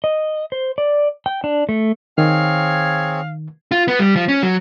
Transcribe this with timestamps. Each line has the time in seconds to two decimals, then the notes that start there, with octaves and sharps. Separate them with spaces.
0.04 D#5
0.52 C5
0.78 D5
1.26 G5
1.44 D4
1.69 A3
2.18 D#3 C4 G#4 C#5 F5
3.71 F4
3.88 B3
4.00 G3
4.16 F3
4.28 C#4
4.43 F#3